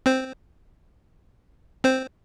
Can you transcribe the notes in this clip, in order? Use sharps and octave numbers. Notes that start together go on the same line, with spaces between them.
C4 C5
C4 C5